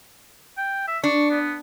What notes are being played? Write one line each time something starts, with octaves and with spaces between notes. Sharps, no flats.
G5
E5
D4 C#6
B3